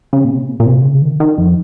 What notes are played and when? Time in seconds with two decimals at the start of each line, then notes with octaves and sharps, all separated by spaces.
0.13 C#3
0.25 A#2
0.31 C3
0.49 A#2
0.60 A#2
0.66 C3
0.84 C#3
1.02 D#3
1.20 D#3
1.38 F2